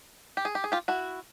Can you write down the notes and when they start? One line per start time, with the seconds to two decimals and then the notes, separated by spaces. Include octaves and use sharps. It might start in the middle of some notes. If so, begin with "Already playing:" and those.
0.37 G4
0.45 G#4
0.55 G4
0.64 G#4
0.72 F4 G4
0.88 E4 F#4